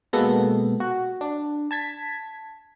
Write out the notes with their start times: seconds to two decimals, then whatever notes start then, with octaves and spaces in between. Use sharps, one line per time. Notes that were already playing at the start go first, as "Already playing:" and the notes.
0.13 B2 G#3 A#3 B3 A4
0.80 F#4
1.21 D4
1.71 A5 G#6 B6